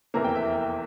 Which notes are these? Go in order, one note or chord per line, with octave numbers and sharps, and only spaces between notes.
F1 E2 C3 E3 A#3 A#5
G5
E5